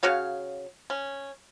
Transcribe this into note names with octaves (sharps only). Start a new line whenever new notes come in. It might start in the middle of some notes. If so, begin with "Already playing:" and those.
C#3 F#4 C#5 F5
C#4